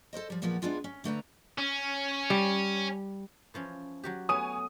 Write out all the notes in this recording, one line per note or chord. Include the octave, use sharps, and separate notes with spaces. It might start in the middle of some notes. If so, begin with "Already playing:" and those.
A4 A#4 C5 D#5
F3 G3
E2 A#2 F3 A#3 B3 F#5
G#3 B3 D4 E4 F4 G#4
C#4
D3 A3 B4 A#5
C#4
G3
E3 F3 C#4
F#3 F#4 G4
A3 B3 C#5 G#5 D#6 D#7